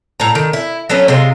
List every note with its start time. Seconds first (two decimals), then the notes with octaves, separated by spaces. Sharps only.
0.20 A2 A#5
0.35 D#3
0.53 E4
0.89 F#3 A3 B3 C#4
1.08 C3 G#3 F4